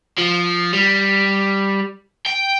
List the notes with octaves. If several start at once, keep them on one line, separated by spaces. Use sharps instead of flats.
F3
G3
G5